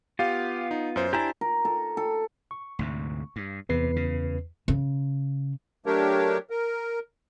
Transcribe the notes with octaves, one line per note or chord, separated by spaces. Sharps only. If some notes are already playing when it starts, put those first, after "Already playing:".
B3 F4 G4 F5
D#4
F#2 C5
D4 E4 G4 C5 G#5 A#5
A#4
A4
A4
C#6
D2 G#2 C3
G2
E2 C3 B4 C7
C#3
C#3
F#3 A3 D4 G4 A#4 C#5
A#4